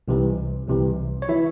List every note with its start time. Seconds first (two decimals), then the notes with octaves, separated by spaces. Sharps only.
0.08 C2 C3 E3
0.68 C2 C3 E3
1.22 C#5
1.29 E3 E4 E5